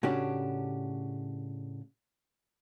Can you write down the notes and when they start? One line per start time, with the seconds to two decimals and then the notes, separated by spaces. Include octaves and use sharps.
0.03 A2 C#3 C#4 D4 F#4 G4